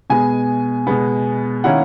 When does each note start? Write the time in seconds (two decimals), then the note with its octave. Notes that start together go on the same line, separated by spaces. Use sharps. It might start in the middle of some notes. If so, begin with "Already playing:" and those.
0.10 B2 G#3 B3 G#5
0.87 B2 G#3 B3
1.64 D#3 A#3 C#4 E4 F#5